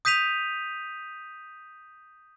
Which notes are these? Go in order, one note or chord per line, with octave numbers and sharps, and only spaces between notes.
D#6 G6 B6 D#7 F7